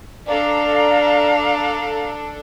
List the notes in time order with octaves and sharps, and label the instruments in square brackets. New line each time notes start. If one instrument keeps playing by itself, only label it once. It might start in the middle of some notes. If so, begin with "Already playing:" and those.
[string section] D4 A4 [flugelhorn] D5 [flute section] F5 A#5